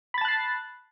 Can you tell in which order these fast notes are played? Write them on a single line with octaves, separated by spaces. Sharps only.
B5 A6 A5 F#6 C7